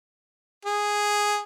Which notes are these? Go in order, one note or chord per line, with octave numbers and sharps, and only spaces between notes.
G#4